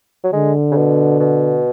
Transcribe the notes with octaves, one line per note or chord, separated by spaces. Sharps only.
F#3
D3 G#3
C#3
B2
B2